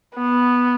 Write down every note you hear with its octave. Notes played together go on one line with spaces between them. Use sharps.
B3